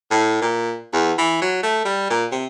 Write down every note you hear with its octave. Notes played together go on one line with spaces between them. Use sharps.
A2
A#2
E2
E3
F#3
A3
G3
A#2
C3